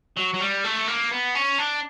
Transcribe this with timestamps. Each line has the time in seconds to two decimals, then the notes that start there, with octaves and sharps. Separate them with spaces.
0.17 F#3
0.34 F#3
0.40 G3
0.64 A3
0.88 A#3
1.11 B3
1.35 C#4
1.59 D4